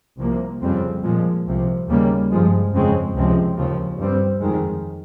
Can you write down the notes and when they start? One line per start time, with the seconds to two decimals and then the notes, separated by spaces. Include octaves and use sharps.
0.18 C2 C3 F3 A#3
0.61 F2 C#3 G3 C4
1.03 A#2 F3 G#3
1.46 C2 C3 F3
1.88 D#2 C#3 G3 A#3
2.31 G2 F3 G#3
2.73 F2 C#3 G#3 C4
3.14 C#2 C3 F3 G#3 C4
3.57 D#2 C#3 F3
3.99 G2 G3 C4
4.41 F2 D#3 G#3